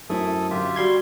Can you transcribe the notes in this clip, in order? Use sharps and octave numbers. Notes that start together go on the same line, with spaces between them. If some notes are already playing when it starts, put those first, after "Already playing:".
F#2 A3 C4 E4 A4 D#6
D3 F#3 F4 G4 E5
G3 F#4 C6 G#6